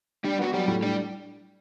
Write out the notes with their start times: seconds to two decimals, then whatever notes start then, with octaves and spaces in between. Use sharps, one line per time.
0.24 G3 D4 G4
0.39 B3 F#4
0.53 F#3 G3 G4
0.68 A2
0.82 G3 D4 G4